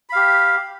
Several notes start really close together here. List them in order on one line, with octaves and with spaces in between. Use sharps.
B5 F5 G4